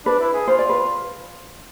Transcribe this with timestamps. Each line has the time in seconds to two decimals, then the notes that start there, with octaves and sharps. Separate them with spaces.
0.06 D4 B4
0.20 E4
0.33 G#4
0.48 F4 C5
0.59 D5
0.69 B4